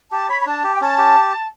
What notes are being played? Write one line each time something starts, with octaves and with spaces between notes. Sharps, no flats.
G4 A5
C#5 B5
B5
D4 A5
G4
G5
C#4 A5
G4